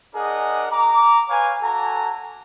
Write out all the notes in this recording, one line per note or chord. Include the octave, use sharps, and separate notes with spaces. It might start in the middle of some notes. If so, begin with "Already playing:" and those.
D4 G#4 A#4 D#5 F#5
A#5 D6
B4 C#5 F5 G#5
F#4 A4 G#5 A#5